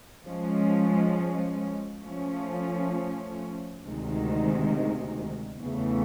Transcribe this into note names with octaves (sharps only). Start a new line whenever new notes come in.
F3 G#3 C#4
F3 A3 C#4
D2 C3 D#3 G#3
E2 C#3 E3 A3